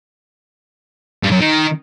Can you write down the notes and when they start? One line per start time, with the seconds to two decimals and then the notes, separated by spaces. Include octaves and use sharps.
1.24 G2
1.32 F#2
1.41 D#3